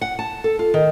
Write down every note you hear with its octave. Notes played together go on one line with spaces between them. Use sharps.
F#5
A5
A4
F4
D#3